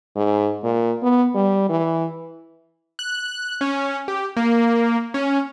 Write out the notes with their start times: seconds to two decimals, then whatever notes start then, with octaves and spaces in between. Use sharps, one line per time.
0.16 G#2
0.64 A#2
1.02 B3
1.35 G3
1.69 E3
2.99 F#6
3.61 C#4
4.08 G4
4.37 A#3
5.14 C#4